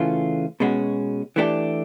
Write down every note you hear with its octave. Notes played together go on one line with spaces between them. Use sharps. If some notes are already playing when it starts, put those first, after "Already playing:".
Already playing: C#3 E3 A3 C#4 F4
B2 G#3 C#4 F#4
E3 A3 D4 G4